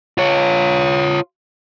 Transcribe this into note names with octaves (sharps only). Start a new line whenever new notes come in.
F4 C#5